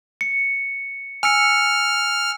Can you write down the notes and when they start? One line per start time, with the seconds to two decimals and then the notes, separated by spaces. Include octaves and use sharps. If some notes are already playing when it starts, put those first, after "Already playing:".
0.21 C#7
1.23 G#5 E6 F6 C#7